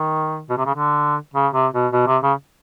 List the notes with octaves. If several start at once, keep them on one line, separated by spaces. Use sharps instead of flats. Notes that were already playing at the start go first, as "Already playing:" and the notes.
Already playing: D#3
B2
C3
C#3
D3
C#3
C3
B2
B2
C3
C#3